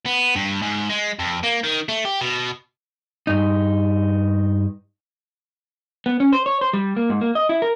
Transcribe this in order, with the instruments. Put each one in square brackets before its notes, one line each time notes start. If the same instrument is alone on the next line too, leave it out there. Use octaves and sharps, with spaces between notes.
[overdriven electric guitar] B3
G2
G#2
G#3
F2
A#3
D#3
A3
G4
B2
[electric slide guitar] G2 D#4
B3
C#4
C5
C#5
C5
G3
A#3
G#2
A#3
D#5
E4
A#4